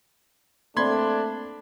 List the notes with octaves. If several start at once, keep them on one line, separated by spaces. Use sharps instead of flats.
A3 A#3 C4 D4 D5 B5 C6 G#6